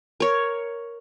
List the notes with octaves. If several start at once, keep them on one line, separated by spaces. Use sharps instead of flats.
A#4 C#5